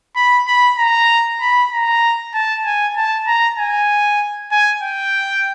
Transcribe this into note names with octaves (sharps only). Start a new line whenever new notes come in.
B5
B5
A#5
B5
A#5
A5
G#5
A5
A#5
G#5
G#5
G5